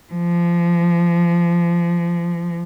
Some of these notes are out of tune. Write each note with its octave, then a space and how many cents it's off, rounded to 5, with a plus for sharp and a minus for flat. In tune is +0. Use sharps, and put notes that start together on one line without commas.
F3 -25